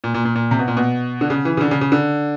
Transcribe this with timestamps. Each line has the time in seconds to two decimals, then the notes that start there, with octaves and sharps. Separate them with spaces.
0.04 A#2
0.14 A#2
0.25 A#2
0.35 A#2
0.51 C3
0.59 B2
0.68 A#2
0.77 B2
1.21 D3
1.30 C#3
1.45 E3
1.57 C#3
1.61 D3
1.71 C#3
1.81 C#3
1.92 D3